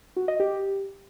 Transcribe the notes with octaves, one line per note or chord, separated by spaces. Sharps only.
F#4
D#5
G4